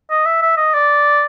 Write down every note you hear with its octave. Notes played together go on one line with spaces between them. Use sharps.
D#5
E5
E5
D#5
D5